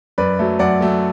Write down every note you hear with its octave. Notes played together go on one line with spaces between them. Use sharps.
F#2 B4 D5
F#3 A3
F#2 D5 F#5
F#3 A3